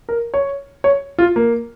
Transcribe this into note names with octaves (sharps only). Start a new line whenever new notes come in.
A#4
C#5
C#5
F4
A#3